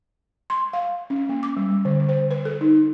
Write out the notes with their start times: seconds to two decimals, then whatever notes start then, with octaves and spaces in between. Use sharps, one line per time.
0.50 C6
0.73 F5
1.10 C#4
1.29 A#3
1.43 D6
1.57 G3
1.85 D3
2.09 C5
2.31 B4
2.45 A4
2.61 D#4